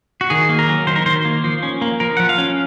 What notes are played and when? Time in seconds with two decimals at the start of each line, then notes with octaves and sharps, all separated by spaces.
0.21 F#4
0.30 D#3 G#4
0.49 A#3
0.59 A#4
0.68 F#3
0.87 D#3 C5
0.96 A#4
1.06 D#3 C5
1.25 A#3
1.44 F3
1.63 C#4
1.82 A#3
2.00 F3 A#4
2.17 F3 F#5
2.29 F5
2.38 C#4